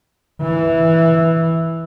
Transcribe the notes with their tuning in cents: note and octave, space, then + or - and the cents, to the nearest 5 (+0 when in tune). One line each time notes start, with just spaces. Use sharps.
E3 -5